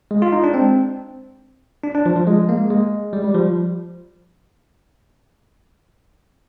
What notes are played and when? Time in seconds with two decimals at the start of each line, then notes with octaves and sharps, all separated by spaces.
0.11 G#3
0.22 F4
0.32 D#4
0.44 D4
0.54 C4
1.84 D4
1.95 D4
2.06 F3
2.16 F3
2.27 G#3
2.49 A#3
2.70 G#3
3.13 G3
3.24 G3
3.35 F3